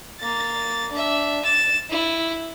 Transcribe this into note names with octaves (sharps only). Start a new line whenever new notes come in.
A#3 A6
D4 E5
A6 E7
E4